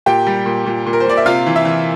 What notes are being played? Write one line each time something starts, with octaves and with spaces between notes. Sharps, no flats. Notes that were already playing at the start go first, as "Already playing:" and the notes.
A#2 G4 G5
G3
A#2
A#2
A#2
A#4
C5
A#2 D5
E5
C3 F4 F5
E3
E4 E5
E3